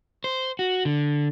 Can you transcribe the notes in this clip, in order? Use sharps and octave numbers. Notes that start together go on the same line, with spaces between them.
C5
F#4
D3